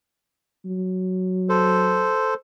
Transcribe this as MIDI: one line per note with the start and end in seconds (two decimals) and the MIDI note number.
0.65 2.13 54
1.49 2.34 69
1.49 2.34 72